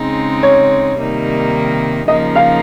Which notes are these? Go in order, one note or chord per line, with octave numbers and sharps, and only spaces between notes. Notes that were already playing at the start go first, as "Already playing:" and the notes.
Already playing: C#3 G#3 C4 D#4
C#5
C3 D#3 G3 A#3 D#4
C#3 F3 A#3 D#4 D#5
F5